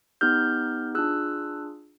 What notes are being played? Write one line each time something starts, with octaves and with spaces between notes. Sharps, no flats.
B3 D#4 G4 F6 G6
D4 F4 G#4 E6 F#6